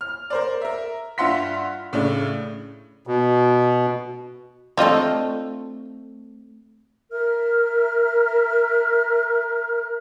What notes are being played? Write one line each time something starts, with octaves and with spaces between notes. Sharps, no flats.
F6
A#4 C5 D5
A#4 E5
G2 F4 E5 F#5 C6 B6
A2 C#3 A3 D4
B2
A3 C4 D4 F4 D#5
A#4 E5 F6